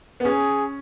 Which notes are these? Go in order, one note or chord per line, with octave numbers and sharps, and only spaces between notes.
B3
C#4 G#4